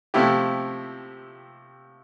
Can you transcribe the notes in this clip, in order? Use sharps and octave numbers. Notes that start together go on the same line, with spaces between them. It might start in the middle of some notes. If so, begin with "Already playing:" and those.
C3 F3 A3 E4 G4